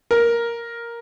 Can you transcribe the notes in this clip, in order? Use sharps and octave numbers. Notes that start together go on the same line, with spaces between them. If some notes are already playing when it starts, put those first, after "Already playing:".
A#4